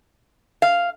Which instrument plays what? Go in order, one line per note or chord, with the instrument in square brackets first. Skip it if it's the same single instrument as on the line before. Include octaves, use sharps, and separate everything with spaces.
[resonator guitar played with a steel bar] F5